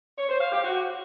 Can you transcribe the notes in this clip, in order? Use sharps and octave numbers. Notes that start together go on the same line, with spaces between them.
C#5
C5
F5
G4
F#4